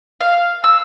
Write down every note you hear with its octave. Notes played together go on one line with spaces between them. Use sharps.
F5
E6